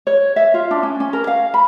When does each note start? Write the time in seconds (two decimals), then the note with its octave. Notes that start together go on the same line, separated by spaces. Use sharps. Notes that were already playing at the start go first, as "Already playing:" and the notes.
0.07 C#5
0.36 E5
0.54 F4
0.71 D4
0.83 C#4
1.00 C#4
1.13 A#4
1.27 F5
1.54 B5